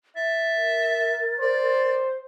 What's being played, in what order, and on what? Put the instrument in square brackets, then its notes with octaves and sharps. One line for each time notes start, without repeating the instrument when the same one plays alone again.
[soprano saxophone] E5 [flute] A6
[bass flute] A#4
[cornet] C5 [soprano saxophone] D5